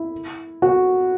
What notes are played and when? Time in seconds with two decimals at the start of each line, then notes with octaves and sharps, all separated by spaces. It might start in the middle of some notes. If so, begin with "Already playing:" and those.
Already playing: E4
0.62 F#4